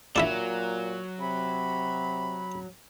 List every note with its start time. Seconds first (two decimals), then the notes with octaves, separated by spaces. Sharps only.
0.16 A#2 F#3 D4 E4 E5
1.20 C3 B5